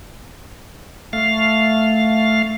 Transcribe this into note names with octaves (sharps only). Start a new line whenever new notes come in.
A3 F5